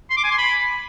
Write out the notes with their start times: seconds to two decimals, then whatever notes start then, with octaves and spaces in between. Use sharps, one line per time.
0.10 C6
0.17 D6
0.24 G#5
0.31 C6
0.38 B5